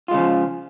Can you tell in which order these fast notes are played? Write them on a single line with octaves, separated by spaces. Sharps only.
F4 G#3 C#3 F3